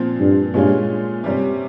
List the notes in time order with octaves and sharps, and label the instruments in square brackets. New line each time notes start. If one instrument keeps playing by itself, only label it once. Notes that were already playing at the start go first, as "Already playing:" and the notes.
Already playing: [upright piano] A#2 F3 C4
[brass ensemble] G2
[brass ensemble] G2 [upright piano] A#2 G#3 C#4 F4
[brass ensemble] G2 [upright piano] C3 G3 C#4